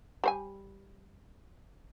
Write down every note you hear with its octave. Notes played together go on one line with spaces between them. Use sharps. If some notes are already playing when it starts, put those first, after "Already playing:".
G3 C5 G#5